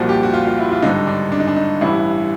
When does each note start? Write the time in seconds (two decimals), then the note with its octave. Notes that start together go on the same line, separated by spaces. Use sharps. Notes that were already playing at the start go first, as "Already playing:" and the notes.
Already playing: C2 A#2 F3 F#4
0.09 G4
0.23 F#4
0.33 F4
0.47 F4
0.59 E4
0.71 F4
0.82 G#1 G2 D3 D#4
1.07 D4
1.32 D4
1.40 D#4
1.47 D4
1.56 D#4
1.81 A1 G2 E3 E4